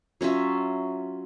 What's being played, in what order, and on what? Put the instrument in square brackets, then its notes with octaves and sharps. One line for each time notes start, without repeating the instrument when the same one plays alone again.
[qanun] F#3 C#4 F4 E5